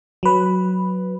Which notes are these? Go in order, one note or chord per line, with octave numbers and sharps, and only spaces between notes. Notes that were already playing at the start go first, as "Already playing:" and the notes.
F#3 B4